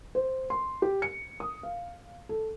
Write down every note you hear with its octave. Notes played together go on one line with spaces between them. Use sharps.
C5
C6
G4
C#7
D#6
F5
A4